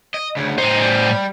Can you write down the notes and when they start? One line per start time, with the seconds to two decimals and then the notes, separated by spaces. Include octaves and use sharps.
0.14 D#5
0.37 D2 C#3
0.58 A2 D#4 C5
0.81 G3